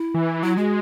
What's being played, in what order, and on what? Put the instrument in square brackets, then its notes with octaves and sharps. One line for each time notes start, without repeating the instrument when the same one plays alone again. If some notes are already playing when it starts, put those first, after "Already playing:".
Already playing: [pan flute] E4
[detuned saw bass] E3
[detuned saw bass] F#3 [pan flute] E4
[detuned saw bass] G#3 [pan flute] F#4